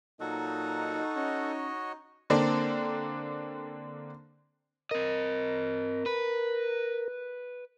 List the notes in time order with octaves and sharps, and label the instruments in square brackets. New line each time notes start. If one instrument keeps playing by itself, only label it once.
[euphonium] A#2 [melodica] F#3 F#4 [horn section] D#4 [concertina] A4 F#5 C#6
[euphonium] C#4 [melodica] F#4 C#5 D#5
[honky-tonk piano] D3 A#3 C4 D4
[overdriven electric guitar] C4 D#5 [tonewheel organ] A#4
[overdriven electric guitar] B4